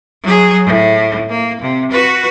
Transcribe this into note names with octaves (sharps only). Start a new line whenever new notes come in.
F#3 G#4
A2
A#3
C3
F#4 B4